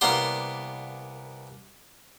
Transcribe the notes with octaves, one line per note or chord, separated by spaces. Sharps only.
C2 A#3 B3 D4 A#5 C6